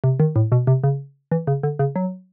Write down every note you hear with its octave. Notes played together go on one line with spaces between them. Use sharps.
C3
D#3
A2
B2
C3
C#3
E3
C#3
D3
C#3
F#3